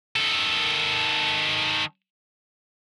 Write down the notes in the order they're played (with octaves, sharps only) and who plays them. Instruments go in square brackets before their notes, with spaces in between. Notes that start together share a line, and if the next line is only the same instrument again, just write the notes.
[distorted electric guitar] D#3 A4